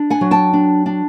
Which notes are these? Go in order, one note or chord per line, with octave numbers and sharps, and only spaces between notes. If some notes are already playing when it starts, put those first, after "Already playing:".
Already playing: D4
F#5 G#5
F#3
G5 A5
D4
D4